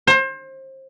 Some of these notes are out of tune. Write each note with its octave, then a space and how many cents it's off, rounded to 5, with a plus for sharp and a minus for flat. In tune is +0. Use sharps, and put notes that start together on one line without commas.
C5 +30